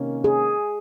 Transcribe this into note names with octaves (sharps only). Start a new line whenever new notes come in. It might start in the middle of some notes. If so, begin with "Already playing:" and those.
Already playing: C3 D#3 A#3 C#4
G#4